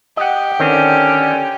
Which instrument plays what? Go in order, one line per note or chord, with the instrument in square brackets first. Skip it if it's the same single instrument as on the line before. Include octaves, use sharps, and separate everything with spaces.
[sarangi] G4 [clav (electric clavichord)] D#5 F#5
[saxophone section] D3 C#4 [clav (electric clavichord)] D#3 C4 G5